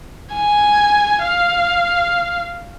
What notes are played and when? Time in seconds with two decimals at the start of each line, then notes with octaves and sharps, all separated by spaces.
0.34 G#5
1.24 F5